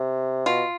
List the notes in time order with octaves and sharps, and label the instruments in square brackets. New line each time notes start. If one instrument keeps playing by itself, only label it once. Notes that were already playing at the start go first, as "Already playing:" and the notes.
Already playing: [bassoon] C3
[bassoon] B2 [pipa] F4